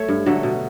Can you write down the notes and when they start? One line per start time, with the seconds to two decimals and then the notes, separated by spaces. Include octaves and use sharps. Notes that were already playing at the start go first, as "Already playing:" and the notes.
Already playing: A3 C#5
0.09 G2
0.26 D3 F#3 A3
0.43 B2